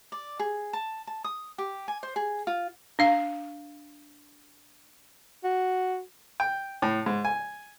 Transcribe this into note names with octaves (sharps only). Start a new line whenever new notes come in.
D5
G#4
A5
A5
D#6
G4
G#5
C5
G#4
F4
D4 F5
F#4
G5
A2
G#2
G#5